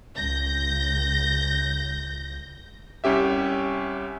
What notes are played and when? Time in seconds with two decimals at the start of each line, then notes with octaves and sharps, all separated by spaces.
0.16 C#2 G6 A#6
3.04 C2 C#4 G4 E5